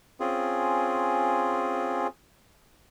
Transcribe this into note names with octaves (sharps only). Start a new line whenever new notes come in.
C4 C#4 F4 G#4